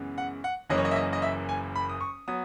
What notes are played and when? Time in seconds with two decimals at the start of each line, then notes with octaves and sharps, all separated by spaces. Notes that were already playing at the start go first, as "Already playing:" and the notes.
Already playing: F#2 C#3 E3 G#3 B3
0.18 F#5
0.44 F#5
0.70 F#1 F#2 E3 A#3 C#4 D#5
0.78 C#5
0.85 D#5
0.91 E5
0.96 D#5
1.13 D#5
1.22 E5
1.49 G#5
1.75 B5
1.89 D#6
2.01 C#6
2.28 F#3 B3 D#6